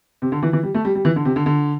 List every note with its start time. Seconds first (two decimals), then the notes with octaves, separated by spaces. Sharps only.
0.22 C3
0.32 D3
0.43 E3
0.53 E3
0.63 G3
0.75 A3
0.85 G3
0.95 G3
1.05 E3
1.16 D3
1.25 C3
1.36 D3
1.46 D3